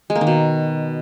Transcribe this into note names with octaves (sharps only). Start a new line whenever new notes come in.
G#3
A#3
D#3
B2